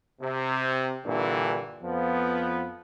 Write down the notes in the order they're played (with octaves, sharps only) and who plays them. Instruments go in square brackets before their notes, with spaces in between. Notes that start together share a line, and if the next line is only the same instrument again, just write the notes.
[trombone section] C3
G2 A#2 D3 E3
F2 F3 B3